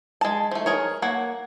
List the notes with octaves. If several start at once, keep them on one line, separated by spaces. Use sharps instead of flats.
G#3 A5
F3 A3
G#4 A#4 C#5
A#3 C#5 F#5